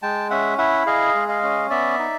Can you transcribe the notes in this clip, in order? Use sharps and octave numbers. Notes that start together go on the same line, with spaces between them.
G#3 G5 A5
C#4 E5 F#5
E4 E5 F#5
G#4 D#5 F5
G#3
D#5 F5
C#4
B3 D5 E5
D#4